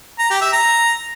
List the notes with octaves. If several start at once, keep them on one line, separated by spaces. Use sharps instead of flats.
A#5
G4
E5
A#5